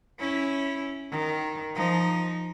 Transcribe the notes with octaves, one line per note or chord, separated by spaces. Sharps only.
C#4 E4
D#3
F3 D#4